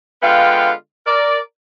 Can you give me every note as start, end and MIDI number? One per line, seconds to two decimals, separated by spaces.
0.22 0.73 50
0.22 0.73 56
0.22 0.73 59
0.22 0.73 65
0.22 0.73 77
0.22 0.73 79
1.06 1.39 70
1.06 1.39 74